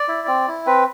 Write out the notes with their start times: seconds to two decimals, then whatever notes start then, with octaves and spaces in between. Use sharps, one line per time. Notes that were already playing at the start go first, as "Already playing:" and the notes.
Already playing: D5
0.08 E4
0.28 C4
0.48 E4
0.66 C4 B4